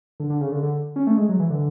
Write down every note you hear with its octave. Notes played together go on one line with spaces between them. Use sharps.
D3
D3
C#3
D3
D3
C#4
A3
G#3
F#3
E3
D3